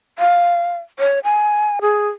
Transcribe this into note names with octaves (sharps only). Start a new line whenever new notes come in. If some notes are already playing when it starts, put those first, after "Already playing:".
F5
C#5
G#5
G#4